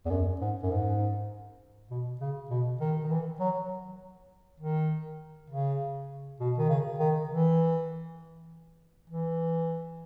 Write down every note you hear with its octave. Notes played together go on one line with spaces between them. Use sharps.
E2
F#2
G#2
F#2
G#2
B2
C#3
B2
D#3
D#3
E3
F#3
D#3
C#3
B2
D#3
C#3
D#3
E3
E3